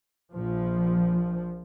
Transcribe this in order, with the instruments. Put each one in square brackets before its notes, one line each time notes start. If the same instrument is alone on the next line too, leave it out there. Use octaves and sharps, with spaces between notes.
[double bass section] A#1 F3